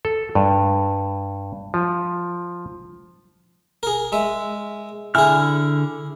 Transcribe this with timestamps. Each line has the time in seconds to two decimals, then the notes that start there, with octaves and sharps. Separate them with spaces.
0.05 A4
0.35 G2
1.74 F3
3.83 G#4 A#4
4.12 G#3 E5
5.15 D3 E4 G#4 G#5 F6